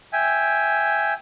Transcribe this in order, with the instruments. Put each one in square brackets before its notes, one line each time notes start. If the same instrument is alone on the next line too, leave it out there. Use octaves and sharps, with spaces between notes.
[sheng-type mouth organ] E5 G5 G#5